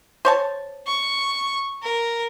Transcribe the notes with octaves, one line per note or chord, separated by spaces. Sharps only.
C5 C#5 A5
C#6
A#4